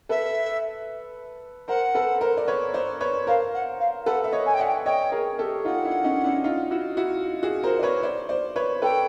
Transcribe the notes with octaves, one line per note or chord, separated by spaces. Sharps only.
A4 B4 E5
A#4 C5 F#5
A4 B4
A#4 C5
D5
B4 C#5
C5 D5
B4 C#5
A#4 C5 F5
F#5
F5
A4 B4 F#5
E5
C#5 D#5
G#5
G5
D5 E5 F#5
G5
C#5 D#5 G5
G#4 A#4
G4 A4
D#4 F4 F#5
D4 E4
C#4 D#4
D4 E4
D#4 F4
E4 F#4
E4 F#4
F#4 G#4
A#4 C5
D5
B4 C#5
C5 D5
C5 D5
B4 C#5
A4 B4 G5